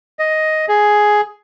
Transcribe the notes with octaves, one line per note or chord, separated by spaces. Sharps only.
D#5
G#4